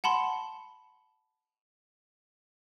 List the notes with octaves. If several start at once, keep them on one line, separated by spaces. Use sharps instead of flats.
F#5 A5 B5 C6